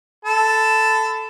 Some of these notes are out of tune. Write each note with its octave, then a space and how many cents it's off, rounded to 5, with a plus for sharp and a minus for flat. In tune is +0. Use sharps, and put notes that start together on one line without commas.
A4 +0 B5 +30